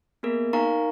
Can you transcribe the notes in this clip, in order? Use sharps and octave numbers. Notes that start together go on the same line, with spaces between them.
A#3 B3 G#4 A#4
D#4 A#4 F5 G#5 A#5 C#6